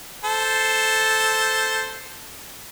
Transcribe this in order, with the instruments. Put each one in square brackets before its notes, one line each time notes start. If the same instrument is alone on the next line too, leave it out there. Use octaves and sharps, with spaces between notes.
[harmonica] A4 C5